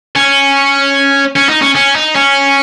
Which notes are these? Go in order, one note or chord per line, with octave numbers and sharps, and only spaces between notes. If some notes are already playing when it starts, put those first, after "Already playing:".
C#4
C#4
D#4
C#4
C#4
D#4
C#4